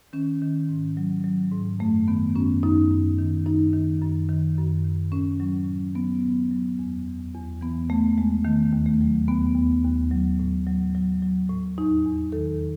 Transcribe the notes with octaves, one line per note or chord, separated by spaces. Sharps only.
D#3 C#4
D#3
G#2
F#3
F#3
G#2
F#2 A3
D#3 B3
F#2 C#4
F#2 D#4
F#2
D#3
F#2 D#4
D#3
F#2
D#3
F#2
D#3
A2 C#4
F#3
A2
F#3 B3
A2
F#3
E2
E2
E2
E3 B3
E2 A3
E2 G#3
D#3 A3
D#2
A3
F#3
D#2 B3
D#2
D#2
F#3
A2
F#3
F#3
F#3
A2
E2 D#4
E2
D#3 A4